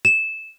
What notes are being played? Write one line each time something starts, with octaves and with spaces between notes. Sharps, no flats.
E7